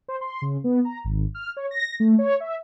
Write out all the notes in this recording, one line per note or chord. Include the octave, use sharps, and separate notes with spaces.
C5
C6
C#3
B3
A#5
G#1
F6
C#5
A#6
A3
C#5
E5